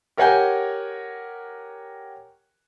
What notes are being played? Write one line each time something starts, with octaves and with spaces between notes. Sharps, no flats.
G4 A#4 C#5 F#5 G#5 G6